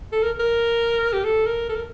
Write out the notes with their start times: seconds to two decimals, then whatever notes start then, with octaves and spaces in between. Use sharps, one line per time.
0.12 A4
0.23 A#4
0.39 A#4
1.13 G4
1.24 A4
1.46 A#4
1.69 A4
1.76 A#4